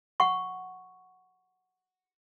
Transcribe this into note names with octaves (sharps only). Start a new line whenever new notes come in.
F#5 C#6